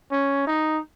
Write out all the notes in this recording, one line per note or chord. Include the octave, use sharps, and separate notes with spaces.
C#4
D#4